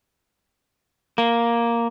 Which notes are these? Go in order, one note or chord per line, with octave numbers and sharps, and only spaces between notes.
A#3